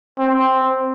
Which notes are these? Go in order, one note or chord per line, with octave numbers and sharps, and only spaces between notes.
C4